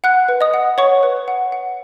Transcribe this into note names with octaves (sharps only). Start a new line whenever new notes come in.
F#5 F#6
B4
D#5 D#6
F#5
C#5 F#5 C#6
B4
F#5
F#5